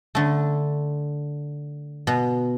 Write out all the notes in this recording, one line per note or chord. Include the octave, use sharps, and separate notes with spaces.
D3 A3
B2